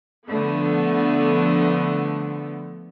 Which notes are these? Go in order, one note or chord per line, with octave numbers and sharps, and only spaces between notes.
D3 F3 A3 B3